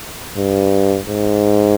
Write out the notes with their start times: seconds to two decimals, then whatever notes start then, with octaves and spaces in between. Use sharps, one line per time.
0.37 G2
1.07 G#2